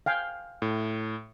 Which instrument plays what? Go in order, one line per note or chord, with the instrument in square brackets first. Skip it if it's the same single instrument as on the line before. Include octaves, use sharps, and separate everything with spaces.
[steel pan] F5 G5 G#5
[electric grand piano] A2